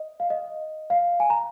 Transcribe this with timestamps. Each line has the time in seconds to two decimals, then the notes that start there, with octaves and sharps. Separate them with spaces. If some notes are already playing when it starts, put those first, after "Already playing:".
Already playing: D#5
0.20 F5
0.30 D#5
0.90 F5
1.20 G#5
1.30 A#5